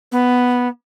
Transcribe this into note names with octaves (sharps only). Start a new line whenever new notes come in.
B3